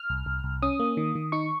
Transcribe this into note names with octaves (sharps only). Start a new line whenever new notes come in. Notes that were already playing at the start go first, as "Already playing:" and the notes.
Already playing: F6
C2
C2
C2
C#4 D#6
A#3
D#3
D#3
D#4 C#6